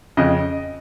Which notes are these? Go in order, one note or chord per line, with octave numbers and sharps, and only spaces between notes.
F2 C#3 D#5